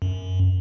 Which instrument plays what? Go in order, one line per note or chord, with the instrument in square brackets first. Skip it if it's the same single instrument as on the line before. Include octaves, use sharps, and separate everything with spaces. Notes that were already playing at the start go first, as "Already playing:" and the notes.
[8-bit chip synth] F#2